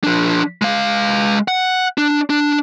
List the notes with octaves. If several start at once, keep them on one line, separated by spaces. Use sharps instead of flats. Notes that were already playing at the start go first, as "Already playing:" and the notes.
F3 D4
G#3 F5
F#5
D4
D4